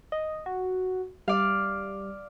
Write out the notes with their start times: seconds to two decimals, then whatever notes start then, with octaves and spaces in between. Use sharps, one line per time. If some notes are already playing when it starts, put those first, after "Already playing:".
0.12 D#5
0.46 F#4
1.28 G3 D5 F5